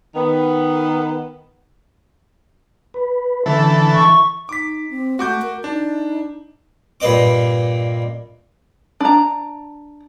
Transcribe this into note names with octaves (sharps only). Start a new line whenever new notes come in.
D#3 B3
B4
D3 E3 A4
C#6
D#4 D6 B6
C4
A3 F#4 D6 G6
A#4
D4 D#4
G2 A#2 B4 D#5 D6
D4 A#5